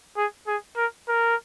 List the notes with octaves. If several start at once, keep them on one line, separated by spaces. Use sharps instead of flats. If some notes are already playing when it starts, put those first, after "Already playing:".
G#4
G#4
A#4
A#4